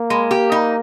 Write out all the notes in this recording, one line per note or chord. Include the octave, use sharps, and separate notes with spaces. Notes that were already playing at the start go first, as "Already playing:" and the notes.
Already playing: A#3
G#3
G4
D#4